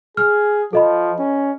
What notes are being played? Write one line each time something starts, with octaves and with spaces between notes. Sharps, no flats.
G#4 F6
F3 A4 D#5 B5
C#4